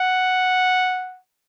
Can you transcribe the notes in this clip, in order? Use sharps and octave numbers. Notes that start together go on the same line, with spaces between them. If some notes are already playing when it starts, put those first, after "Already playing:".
Already playing: F#5